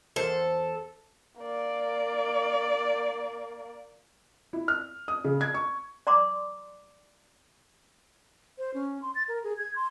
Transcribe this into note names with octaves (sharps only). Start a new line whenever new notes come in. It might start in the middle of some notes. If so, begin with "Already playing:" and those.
E2 A4 A#4 C5
A#3 D5
E4
F6
D#6
C#3
G#6
C#6
D5 A#5 C6 D6
C5
C#4
C6
A6
A#4
G#4
G#6
C6